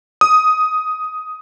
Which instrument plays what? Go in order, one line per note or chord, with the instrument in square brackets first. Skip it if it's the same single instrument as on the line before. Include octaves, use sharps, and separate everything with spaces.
[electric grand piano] D#6